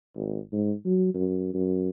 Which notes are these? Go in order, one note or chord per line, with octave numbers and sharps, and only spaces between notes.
G#1
G#2
F#3
F#2
F#2